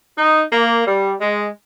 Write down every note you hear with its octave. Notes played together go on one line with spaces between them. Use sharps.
D#4
A#3
G3
G#3